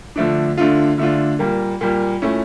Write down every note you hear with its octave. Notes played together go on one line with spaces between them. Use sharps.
D3 F3 A3 D4
D3 A3 D4 F4
D3 A3 D4 F4
A#2 G3 A#3
A#2 G3 A#3
A#2 A3 C#4 E4